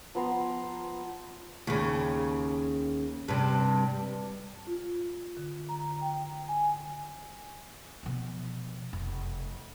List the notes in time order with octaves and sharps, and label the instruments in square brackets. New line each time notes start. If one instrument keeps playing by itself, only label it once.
[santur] F3 B3 A#5 C6
[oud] D#2 C#3
G2 C3
[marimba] F4
D3
A#5
G5
G#5
[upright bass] B2 F3
F1